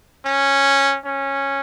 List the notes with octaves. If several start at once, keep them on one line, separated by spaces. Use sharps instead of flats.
C#4
C#4